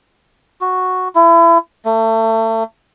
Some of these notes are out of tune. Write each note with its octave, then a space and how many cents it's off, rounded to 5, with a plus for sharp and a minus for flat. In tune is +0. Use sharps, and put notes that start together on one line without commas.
F#4 -5
E4 +30
A3 +30